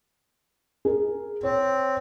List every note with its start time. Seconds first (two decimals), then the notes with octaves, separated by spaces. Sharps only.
0.85 G#4 A#4
1.43 C4 C#5